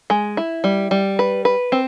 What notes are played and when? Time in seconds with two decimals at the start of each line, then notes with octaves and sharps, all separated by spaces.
0.10 G#3
0.37 E4
0.64 G3
0.91 G3
1.19 B4
1.45 B4
1.72 C4